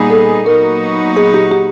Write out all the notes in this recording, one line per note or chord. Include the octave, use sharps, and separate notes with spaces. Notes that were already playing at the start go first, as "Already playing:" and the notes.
Already playing: A#2 G3 B3 D#4 G#4
A4
A#2 F#3 B3 D#4 F#4 A#4
G#4
G4
G4